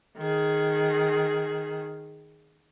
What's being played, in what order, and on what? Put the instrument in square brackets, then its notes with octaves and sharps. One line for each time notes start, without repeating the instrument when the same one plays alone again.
[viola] D#3 G#4